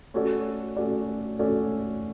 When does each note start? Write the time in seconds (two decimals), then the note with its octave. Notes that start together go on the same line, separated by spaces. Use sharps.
0.14 A3 C#4 F#4 A4 D5
0.77 A3 C#4 F#4 A4 D5
1.39 A3 C#4 F#4 A4 D5